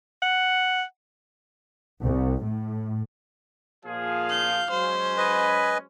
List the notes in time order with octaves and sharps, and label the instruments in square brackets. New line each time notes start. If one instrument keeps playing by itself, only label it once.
[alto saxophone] F#5
[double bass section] C2
A2
[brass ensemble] A#2 F3 G#4 [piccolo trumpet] F5
[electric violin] G6
[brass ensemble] F#3 G#3 C#4 [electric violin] C5
[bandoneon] B4 D#5 G#5 [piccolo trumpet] B5